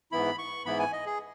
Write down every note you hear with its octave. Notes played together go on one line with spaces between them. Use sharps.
G#2 E3 B3 E4 B5
C#6
G#2 E3 B3 E4 B5
G#5
D#5
G#4